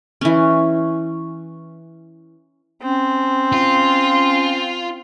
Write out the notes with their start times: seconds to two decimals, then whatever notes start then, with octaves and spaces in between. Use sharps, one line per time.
0.21 E3 C#4
2.83 C4 C#4
3.52 F4